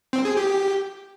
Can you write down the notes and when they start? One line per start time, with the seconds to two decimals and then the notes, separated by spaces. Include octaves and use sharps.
0.13 C4
0.25 G#4
0.37 G4